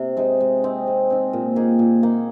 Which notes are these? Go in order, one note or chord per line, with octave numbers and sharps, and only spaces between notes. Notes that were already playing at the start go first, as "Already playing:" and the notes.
Already playing: C3
G#3 D#4 C5
G#3
C4 D#4
G#3
C4 D#4
A#2
A#3 D#4 G#4
A#2
A#3 D#4 G#4